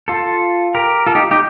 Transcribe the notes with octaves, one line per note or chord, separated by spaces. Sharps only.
F4 A4
G4 A#4
F4 A4
D#4 G4
D#4 G4